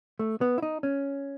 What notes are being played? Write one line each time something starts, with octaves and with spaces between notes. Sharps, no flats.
A3
B3
E4
D#4
C#4